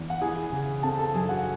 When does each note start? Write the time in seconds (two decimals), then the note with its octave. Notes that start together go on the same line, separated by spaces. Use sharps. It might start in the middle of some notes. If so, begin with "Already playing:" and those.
Already playing: E2
0.10 F#5
0.21 E3 G#4 G#5
0.52 C#3
0.83 C4 A4 A5
0.98 A4 A5
1.14 F#2 G#4 G#5
1.29 F#4 F#5